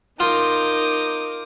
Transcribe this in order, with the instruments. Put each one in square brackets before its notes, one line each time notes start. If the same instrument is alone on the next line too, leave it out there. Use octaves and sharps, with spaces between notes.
[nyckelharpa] D#4 A#4 [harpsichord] F4 [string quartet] D6 D#6 G6